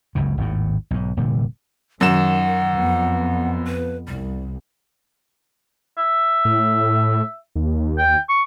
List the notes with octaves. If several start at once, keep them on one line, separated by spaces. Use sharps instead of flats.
F#1 C#2 F#2 C#3
G#1 D#2 A2
B1 G#2
F1 A#2 D3 G3
F#2 D#3 F#5 E7
F2 B3
B4
C2 G3
E5
A2
D#2
G5
C#6